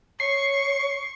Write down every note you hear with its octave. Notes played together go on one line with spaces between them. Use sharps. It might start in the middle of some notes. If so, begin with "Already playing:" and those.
C#5 C#6 C7